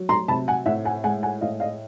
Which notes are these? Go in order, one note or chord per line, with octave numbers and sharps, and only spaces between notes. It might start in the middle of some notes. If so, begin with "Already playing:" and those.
Already playing: F#3
A#5 C6
C3 A5 B5
F#5 G#5
A2 E5 F#5
F#5 G#5
G#3 F#5 G#5
F#5 G#5
A2 D#5 F5
D#5 F5